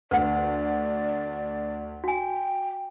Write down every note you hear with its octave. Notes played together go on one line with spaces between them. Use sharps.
D2 B4 D5 F#5
F#4 G5 G#5